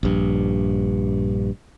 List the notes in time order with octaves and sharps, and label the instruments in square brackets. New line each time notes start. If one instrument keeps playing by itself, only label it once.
[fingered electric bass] A#1 G2